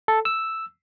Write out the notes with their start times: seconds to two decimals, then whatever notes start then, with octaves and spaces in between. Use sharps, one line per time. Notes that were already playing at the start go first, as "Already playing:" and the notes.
0.08 A4
0.25 E6